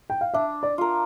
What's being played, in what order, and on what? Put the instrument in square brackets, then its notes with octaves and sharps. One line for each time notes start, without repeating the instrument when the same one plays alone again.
[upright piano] G5
F5
[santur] D4 [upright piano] E5
[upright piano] D5
[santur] F4 A#4